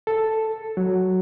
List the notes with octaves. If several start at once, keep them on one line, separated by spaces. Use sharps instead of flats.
A4
F#3